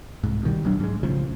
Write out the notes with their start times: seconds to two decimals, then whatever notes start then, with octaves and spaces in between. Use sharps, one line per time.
0.24 C2 G#2
0.43 B2 D#3 G3
0.64 E1 B1 F#3 D4
0.80 G#2 G#3
1.03 B1 A2 C#3 F3